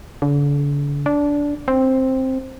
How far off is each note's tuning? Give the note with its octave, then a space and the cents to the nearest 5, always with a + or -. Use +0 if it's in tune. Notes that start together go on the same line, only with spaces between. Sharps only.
D3 -40
D4 -15
C4 +5